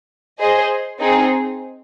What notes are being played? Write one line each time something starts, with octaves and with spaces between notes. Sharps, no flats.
G#4 C5 D#5
C4 D#4 G#4